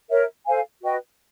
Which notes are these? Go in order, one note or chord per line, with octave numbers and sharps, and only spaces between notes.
A#4 C#5 E5
A4 C5 F5 G#5
F#4 B4 D#5 G5